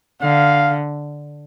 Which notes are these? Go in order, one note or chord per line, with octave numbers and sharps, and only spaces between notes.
D3 F5